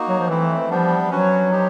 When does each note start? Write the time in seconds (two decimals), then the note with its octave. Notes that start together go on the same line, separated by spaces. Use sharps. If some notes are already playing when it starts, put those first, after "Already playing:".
Already playing: A#3 D#4 F#4
0.08 F#3
0.19 F3
0.28 E3 A3 C4 E4
0.69 F3 G3 B3 D4
1.10 F#3 C#4 F#4 B4
1.50 D#4 G4 C5